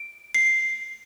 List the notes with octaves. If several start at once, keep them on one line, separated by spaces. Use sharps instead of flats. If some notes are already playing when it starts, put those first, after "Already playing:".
Already playing: D7
C7